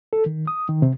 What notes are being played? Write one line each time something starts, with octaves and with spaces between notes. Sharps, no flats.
A4
D#3
D#6
D#3
C3